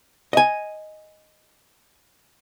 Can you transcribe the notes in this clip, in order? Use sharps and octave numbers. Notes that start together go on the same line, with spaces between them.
D#5 G#5